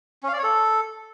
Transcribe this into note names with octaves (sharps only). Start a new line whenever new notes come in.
C#4
F5
D5
C#5
A4